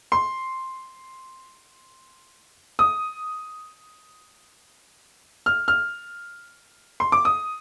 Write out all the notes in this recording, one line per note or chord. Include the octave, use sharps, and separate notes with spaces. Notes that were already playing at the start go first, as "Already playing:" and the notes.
C6
D#6
F6
F6
C6
D6
D#6